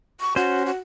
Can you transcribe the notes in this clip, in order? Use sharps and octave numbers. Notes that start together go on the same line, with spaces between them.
C#6
C#4 F#4 C5
F#4